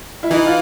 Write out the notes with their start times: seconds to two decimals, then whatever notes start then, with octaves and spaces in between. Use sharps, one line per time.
0.23 E4
0.31 E3 D#4
0.46 F4